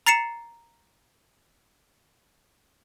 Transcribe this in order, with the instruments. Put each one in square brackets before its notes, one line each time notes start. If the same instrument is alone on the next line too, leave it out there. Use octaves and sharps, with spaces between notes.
[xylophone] A#5 A6 C7 C#7 E7